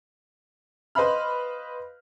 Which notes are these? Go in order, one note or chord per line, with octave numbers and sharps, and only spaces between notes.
B4 C5 D#5 F5 B5 F6